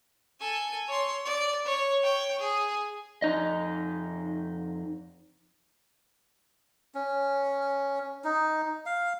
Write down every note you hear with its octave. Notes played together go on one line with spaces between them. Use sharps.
A4 G#5
C#5 C6
D5
C#5
C#5 G5
G#4
F2 D#4 D#5
C#4
D#4
F5